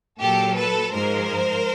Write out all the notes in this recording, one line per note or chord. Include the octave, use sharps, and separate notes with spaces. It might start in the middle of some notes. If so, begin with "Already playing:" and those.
A#2 F#3 G4 A4
A4 B4
G#2 F3 G#3 A#4 C5